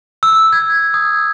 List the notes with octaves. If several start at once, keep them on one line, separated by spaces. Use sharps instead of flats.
E6
G#6
D#6